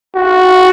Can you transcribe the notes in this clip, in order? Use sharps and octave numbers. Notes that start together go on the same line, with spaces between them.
F#4